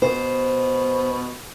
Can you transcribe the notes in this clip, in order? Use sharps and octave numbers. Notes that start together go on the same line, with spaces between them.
B2 C5